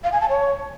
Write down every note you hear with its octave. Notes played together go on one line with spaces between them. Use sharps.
F5
G#5
A5
C#5